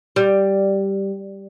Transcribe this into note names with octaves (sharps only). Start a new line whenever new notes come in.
G3